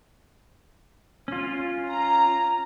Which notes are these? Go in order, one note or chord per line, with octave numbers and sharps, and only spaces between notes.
C#4 F4
A#5